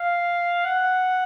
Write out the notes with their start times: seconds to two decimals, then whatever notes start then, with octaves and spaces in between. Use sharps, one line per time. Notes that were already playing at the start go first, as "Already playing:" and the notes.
Already playing: F5
0.64 F#5